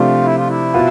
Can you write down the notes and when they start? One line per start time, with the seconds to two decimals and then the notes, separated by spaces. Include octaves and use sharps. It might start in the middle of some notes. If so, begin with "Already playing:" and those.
Already playing: C3 F3 A3 D4 F4 G4
0.23 E4
0.36 F4
0.48 E4
0.74 B2 B3 F4